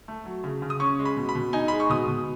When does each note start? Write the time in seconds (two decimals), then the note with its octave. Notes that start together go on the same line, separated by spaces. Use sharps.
0.08 A3
0.25 F#3
0.44 C#3
0.62 C#3
0.70 D#6
0.80 C#4 C#6
0.99 G#3
1.05 B5
1.17 B2
1.29 B5
1.35 B2
1.53 D#4 G#5
1.68 G#3 B5
1.80 C#6
1.90 B2 D#6
2.08 B2